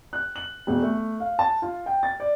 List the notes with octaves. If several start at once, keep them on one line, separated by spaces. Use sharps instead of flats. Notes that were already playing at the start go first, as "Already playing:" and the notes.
F#6
F#7
E1
A3
F5
A5
F4
G5
A6
D5